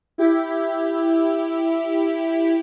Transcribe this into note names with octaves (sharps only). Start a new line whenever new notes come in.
E4 G4